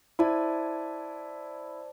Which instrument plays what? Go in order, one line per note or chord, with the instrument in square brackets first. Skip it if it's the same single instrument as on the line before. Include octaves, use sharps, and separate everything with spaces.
[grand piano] E4 [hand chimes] C5 D5 A5